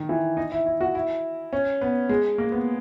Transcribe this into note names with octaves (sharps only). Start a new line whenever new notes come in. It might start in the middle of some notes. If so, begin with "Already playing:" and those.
Already playing: D#3
E3
D#4
E4
E4
F#4
E4
C#4
B3
G#3
A#3
B3